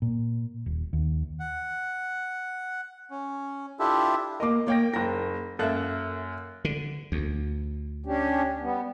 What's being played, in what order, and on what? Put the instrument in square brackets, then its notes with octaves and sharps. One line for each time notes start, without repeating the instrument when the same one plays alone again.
[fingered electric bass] A#2
D#1
D#2
[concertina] F#5
C#4
D4 E4 F4 G4 A4 E5
[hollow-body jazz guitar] A#3 A#4 [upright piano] D#5 D6
[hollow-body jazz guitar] A#3 [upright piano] C#5 G5 A#6
[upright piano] F#1 A#6 [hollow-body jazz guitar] A#4
[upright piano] F#2 A#3 F#6 [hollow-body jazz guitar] A4 E5
[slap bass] D3
D2
[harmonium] C#4 D4 G4
G3 B3